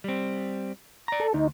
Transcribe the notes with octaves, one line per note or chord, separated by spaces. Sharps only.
G3 C4
D5 A#5
A4
D2 D#4